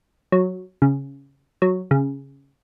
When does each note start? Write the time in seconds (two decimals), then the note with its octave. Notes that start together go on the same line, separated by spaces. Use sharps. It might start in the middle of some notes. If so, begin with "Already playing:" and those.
0.32 F#3
0.82 C#3
1.62 F#3
1.91 C#3